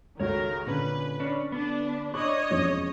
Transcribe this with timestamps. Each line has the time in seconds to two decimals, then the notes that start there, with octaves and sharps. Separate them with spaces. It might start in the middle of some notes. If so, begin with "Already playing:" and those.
0.19 C#2 D#3 F#4 A4 A#4 C#5
0.67 A#2 D3 C#4 B4
1.20 C#4 D4
1.52 B3 D4
2.14 D4 C#5 D#5 B5 C#6
2.50 E1 F2 C#4